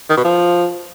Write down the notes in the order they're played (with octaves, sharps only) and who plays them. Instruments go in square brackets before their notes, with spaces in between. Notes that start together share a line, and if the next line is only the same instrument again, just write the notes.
[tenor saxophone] D#3
B2
F3